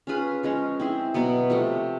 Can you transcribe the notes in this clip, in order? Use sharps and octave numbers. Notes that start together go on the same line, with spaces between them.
C#4 F4 G#4 B4
F3 G#3 C#4
C4 E4 G#4
B2 F#3 B3
C3 F3 A3